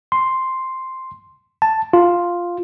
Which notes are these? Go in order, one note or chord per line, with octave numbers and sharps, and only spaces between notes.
C6
A5
F4